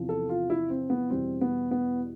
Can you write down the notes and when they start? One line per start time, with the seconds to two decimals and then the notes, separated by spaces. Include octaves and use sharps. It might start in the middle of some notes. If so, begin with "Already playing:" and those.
Already playing: E2 C3 F3
0.09 A4
0.29 F4
0.50 E4
0.70 C4
0.90 B3
1.10 E2 B2 G3 C4
1.41 B3
1.71 B3